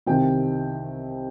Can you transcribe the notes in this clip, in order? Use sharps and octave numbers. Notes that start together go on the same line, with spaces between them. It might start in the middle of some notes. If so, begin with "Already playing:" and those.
C2 C3 D#3 G5